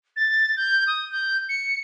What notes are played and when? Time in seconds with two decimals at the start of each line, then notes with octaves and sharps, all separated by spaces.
0.16 A6
0.57 G6
0.87 D#6
1.12 G6
1.49 C#7